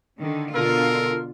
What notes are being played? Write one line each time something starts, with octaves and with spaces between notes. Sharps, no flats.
D3 D#3
B2 D3 F4 A4 A#4